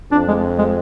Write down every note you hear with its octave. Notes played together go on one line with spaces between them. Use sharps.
F2 D4
G#3
G#3